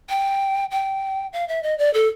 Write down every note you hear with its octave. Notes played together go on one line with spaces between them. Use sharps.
G5
G5
F5
E5
D#5
D5
A4